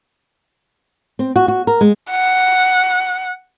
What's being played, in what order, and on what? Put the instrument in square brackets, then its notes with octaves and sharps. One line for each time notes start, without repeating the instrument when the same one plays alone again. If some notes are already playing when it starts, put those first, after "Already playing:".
[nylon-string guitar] C4
F#4
F#4
A#4
G#3
[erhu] F#5